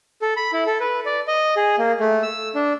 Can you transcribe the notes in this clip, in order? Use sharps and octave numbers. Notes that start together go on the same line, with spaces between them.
A4
B5
E4
A4
B4
D5
D#5
G#4
A#3
A3
E6
D4